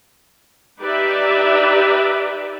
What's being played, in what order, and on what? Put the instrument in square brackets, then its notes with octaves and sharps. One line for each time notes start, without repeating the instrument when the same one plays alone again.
[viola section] D#4 G4 B4 D5 E5